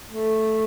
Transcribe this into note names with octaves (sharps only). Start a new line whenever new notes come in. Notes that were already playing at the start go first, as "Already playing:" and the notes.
A3